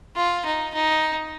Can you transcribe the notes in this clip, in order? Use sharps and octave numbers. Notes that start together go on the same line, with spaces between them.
F4
D#4
D#4